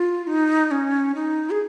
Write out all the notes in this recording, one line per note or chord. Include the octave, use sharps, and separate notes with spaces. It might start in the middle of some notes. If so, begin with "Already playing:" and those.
Already playing: F4
D#4
C#4
D#4
G#4